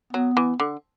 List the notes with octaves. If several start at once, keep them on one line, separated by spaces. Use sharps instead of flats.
F#3 B3
E3
D3